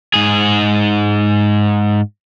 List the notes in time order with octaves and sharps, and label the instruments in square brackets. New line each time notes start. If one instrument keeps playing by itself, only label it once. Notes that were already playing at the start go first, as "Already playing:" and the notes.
[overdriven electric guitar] G#2 G#4